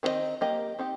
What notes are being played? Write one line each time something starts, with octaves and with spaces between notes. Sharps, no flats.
D#3 C4 F4 D#5
A#3 G4 A#4 D#5
C4 D#4 G4